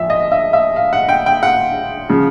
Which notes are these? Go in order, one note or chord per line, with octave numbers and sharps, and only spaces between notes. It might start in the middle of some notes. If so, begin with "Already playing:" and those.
Already playing: A#1 F3 E5
D#5
E5
E5
F5
F#5
G5
G5
F#5
C#3 F3